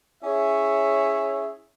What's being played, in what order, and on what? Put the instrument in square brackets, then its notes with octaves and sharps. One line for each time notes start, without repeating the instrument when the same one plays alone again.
[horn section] C#4 E4 G#4 C#5 E5